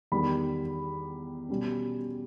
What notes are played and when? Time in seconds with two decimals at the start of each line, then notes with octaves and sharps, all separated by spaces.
0.12 E2 D#3 G3 B5
1.49 B2 G3 C#4